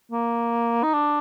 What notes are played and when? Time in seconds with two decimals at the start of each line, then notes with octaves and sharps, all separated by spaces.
0.12 A#3
0.83 D#4
0.94 D4